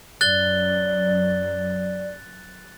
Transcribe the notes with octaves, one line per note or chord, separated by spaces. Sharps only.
F#2 D5 F#6 A6 G7